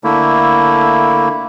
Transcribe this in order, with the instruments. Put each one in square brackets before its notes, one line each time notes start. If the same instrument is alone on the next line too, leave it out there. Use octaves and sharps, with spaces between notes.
[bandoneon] D3 A3 A#3 E4